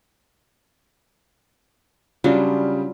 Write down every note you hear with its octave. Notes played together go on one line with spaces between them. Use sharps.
C#3 F#3 G3 C#4 D4 F4